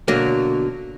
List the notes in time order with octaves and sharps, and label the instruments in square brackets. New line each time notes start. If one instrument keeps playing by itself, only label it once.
[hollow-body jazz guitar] B2 D3 F#3 A#3